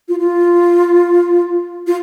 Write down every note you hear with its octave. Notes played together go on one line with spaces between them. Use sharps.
F4
F4
F4